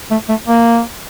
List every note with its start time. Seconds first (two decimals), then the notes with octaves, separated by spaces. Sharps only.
0.11 A3
0.29 A3
0.47 A#3